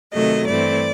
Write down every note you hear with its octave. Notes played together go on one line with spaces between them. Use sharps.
C3 D#3 F#3 A3 D#5
G2 E3 A3 C4 D5